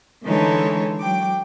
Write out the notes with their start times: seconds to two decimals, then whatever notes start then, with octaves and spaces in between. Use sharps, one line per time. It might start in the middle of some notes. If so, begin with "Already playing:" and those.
0.24 D3 E3 G#3 D#4 A4 C#5
0.99 F#3 G5 D6